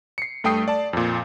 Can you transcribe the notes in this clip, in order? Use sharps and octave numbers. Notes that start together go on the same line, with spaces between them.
C7 C#7
G2 A3 G5 D#6 C7
D5 A5
F2 A#2